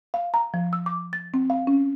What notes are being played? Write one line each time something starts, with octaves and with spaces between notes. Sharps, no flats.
F5
A#5
F3
E6
D6
A6
C4
F5
C#4